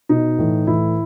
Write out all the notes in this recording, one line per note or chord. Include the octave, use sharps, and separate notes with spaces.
B2 D#4
A2 E3
A2 E3 E4